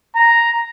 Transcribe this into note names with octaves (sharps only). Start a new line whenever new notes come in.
A#5